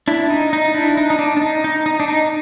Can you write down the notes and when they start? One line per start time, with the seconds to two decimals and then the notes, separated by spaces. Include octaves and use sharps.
0.08 D4 E4
0.30 D#4
0.53 D#4
0.74 D4 E4
0.97 D#4
1.10 D#4
1.19 D4
1.37 D4
1.42 D#4
1.64 D#4
1.86 D#4
2.00 D4
2.08 D#4